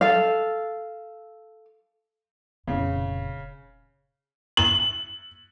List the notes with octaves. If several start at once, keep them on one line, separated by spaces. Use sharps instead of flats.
A4 F5
F1 A#2 C#3
F#7